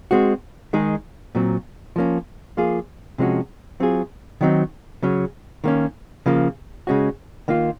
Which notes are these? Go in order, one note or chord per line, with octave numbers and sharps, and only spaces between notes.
G#3 C4 F#4
D#3 G#3 D#4 G#4
A#2 F#3 C4
F3 A#3 C#4
F3 A#3 F4 G#4
C3 F3 G#3 C#4 F#4
F#3 C4 F4 G#4
D#3 F#3 C4 D#4
C#3 F#3 C#4
D#3 A#3 C#4
C#3 F3 A#3
C#3 G#3 C#4 F#4
D#3 A#3 F4